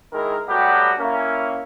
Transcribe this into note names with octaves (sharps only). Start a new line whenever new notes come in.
D#3 G#3 E4 A#4
F#3 G3 A3 B3 F#4 G4
A#3 C#4 E4